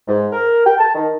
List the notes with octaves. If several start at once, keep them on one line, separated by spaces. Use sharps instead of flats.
G#2
A#4
G5
A5
D#3